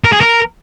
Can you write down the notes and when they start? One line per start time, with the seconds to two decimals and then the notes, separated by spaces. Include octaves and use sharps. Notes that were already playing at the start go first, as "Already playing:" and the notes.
0.04 A#4
0.13 G#4
0.21 A#4